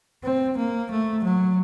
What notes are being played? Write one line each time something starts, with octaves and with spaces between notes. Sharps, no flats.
C4
A#3
A3
F#3